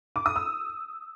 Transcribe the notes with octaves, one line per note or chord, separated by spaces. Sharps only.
D6
D#6
E6